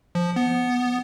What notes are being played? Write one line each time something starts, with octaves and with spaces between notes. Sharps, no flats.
F3
B3